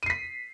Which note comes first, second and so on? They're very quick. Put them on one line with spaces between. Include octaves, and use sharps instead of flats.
D#7 C7 B6